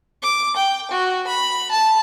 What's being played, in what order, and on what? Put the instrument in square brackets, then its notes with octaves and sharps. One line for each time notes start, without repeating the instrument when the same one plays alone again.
[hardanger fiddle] D6
G5
F#4
B5
A5